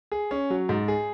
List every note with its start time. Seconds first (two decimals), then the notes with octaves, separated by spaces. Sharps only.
0.12 G#4
0.31 C#4
0.50 F#3
0.69 G#2
0.88 G#4